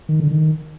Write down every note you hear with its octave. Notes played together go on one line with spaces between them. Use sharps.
D#3
D3
D#3